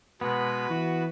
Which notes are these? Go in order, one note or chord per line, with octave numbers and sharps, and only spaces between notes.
B2 G#3 B3 B4
E3 F#4